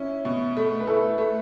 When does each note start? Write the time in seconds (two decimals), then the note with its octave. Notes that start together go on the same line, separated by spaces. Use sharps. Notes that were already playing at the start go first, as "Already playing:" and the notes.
Already playing: C#4 E4
0.25 B2
0.57 A3
0.80 B4
0.87 A3 E4 A4
1.18 A3